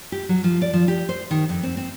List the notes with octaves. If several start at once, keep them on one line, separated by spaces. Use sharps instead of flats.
G4
F#3
F3
D5
F3
G4
C5
D#3
F2
C4
C4